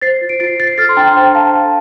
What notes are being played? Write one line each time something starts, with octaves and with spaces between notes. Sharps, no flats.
C5 A6 C7
F4
D7
F4 A6 C7
C5 A6 C7
A4 F6 A6
C6
D4 G5 A#5
C5 G5
D4 F5 A5
A4